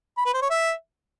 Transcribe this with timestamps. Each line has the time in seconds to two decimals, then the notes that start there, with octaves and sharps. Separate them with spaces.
0.18 B5
0.26 B4
0.34 C5
0.42 C#5
0.50 E5